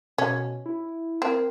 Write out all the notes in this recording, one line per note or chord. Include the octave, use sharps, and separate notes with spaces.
B2 C#4
E4
C4 A#4